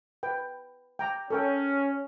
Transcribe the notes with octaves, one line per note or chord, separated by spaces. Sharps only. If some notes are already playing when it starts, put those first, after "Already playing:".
B4 G5
G5 A#5 D6
C#4 A4 A#4 G5